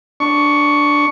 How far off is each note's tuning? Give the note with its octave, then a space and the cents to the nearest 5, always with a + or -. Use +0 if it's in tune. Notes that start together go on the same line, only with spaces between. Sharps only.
D4 +0 C#6 +10